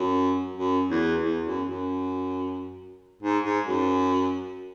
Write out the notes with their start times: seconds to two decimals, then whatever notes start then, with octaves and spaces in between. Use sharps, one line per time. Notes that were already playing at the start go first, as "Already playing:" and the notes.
Already playing: F#2
0.57 F#2
0.90 E2
1.23 E2
1.46 F#2
1.68 F#2
3.23 G#2
3.45 G#2
3.67 F#2